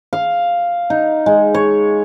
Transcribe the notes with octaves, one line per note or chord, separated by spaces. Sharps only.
F5
D#4
G#3
C#5